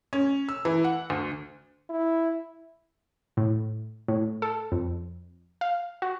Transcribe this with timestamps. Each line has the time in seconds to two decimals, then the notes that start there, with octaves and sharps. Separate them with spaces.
0.13 C#4
0.49 E6
0.65 E3
0.84 F#5
1.10 D2
1.89 E4
3.37 A2
4.08 A2
4.42 A4
4.72 F2
5.61 F5
6.02 F#4